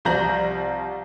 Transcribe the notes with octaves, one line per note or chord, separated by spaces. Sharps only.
C2 F3 A#5 G6 A#6 F#7